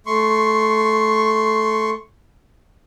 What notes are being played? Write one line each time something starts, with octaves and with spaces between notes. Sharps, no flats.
A3 C6 C#6